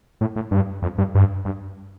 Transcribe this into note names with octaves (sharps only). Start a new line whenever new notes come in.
A2
A2
G2
F2
G2
G2
G2